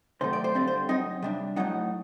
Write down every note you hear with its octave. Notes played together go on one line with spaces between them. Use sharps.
C3 D#3 F#3 A3 C5
D5
C5
G2 D3 G3 C4 D5
C5
F#2 F#3 C4 D#4 D#5
C3 G3 D4
A2 F#3 A#3 D#4 F#5